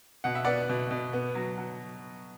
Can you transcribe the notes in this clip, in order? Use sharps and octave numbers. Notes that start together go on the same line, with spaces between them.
B2 F#5
E5
B3 D5 F#5
B2
B2
B3
F#3
F#3